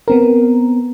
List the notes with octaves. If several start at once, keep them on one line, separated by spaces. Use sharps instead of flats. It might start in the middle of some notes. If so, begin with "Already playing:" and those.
B3 C4 A#4